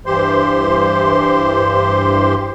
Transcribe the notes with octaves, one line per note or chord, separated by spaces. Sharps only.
G2 E3 G4 C5 C6